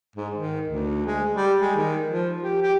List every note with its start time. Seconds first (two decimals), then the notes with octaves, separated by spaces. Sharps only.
0.16 G#2
0.36 D#3
0.68 D2
1.06 G#3
1.34 G3
1.61 G#3
1.76 D#3
2.09 F3
2.42 G4
2.62 G4